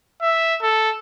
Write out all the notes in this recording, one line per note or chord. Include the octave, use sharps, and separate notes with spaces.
E5
A4